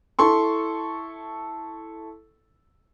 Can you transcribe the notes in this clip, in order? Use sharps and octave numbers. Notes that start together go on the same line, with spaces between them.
E4 A4 C6 C#6